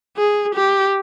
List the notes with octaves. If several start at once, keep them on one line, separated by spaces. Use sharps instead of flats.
G#4
G4